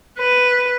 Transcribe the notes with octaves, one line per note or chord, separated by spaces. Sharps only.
B4